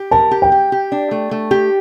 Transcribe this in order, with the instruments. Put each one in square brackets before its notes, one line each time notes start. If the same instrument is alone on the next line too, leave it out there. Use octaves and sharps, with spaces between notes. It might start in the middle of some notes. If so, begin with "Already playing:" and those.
Already playing: [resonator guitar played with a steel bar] G4
[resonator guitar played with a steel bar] A#4 [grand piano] A5
[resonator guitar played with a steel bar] G4
[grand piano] G5
[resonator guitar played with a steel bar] G4
G4
D4
A3
A3
G4